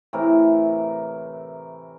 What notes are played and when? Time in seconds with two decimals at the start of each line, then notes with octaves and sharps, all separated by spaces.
0.13 A2 C3 E3 A#4